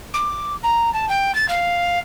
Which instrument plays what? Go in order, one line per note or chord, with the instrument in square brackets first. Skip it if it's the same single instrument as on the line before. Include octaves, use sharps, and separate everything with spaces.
[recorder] D6
A#5
A5
G5
A6
F5